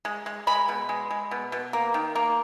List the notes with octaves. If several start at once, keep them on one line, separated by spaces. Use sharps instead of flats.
G#3
G#3
G#3 B5
B2
G#3
G#3
B2
B2
A#3
D#3
A#3